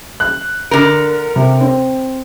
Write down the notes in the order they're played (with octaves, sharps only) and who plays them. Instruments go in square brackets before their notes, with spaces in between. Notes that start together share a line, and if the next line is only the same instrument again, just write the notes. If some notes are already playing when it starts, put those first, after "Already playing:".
[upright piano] F#6
[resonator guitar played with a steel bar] D3 A#4
[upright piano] C3
C4